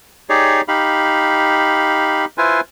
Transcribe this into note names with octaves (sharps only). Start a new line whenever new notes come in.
D#4 G4 G#4 C#5 D5
D#4 G4 F5 B5
E4 F4 B4 C5 G#5